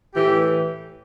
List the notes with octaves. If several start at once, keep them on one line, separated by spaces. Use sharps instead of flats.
A2 E3 G4